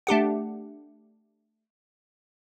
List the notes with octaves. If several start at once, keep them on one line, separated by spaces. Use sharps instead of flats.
A3 D4 G4 F#5